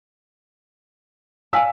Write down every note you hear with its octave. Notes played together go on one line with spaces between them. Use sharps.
D5 F5 G#5 A5 E6 B6